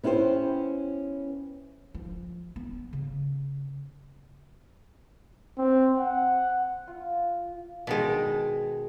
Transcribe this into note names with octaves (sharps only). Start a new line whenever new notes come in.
B3 C#4 E4 G4 C5
F3
B3
C#3
C4
F#5
F4
B2 D#3 G#3